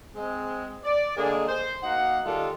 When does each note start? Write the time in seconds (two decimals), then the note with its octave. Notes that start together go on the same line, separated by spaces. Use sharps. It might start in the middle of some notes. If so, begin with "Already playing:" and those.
0.15 G#3 C4
0.84 D5
1.16 D3 G#3 A#3 G#4
1.48 C5
1.83 A#3 D#4 F#4 F#5
2.25 D#3 G3 G#3 F4 A4